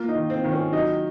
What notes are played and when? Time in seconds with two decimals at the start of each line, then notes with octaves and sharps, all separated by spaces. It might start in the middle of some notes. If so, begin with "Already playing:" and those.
Already playing: A#3 F4
0.08 D#4
0.15 D#3
0.30 C4
0.44 D#3
0.51 C#4
0.73 F#3 D#4